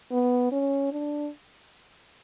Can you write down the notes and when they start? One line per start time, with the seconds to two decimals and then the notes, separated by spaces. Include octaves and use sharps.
0.11 B3
0.52 C#4
0.92 D4